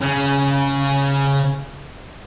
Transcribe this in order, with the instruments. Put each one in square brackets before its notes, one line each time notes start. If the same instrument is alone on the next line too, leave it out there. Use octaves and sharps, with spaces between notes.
[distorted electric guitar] C#3 C#4